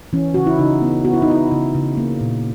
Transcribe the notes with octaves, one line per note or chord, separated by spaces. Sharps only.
E3 C#4
C#3 F#4
E4
C#3 D#4
B3
B3 F#4
E4
D#4
B3 E4
C#3
C#3
A#3
A#2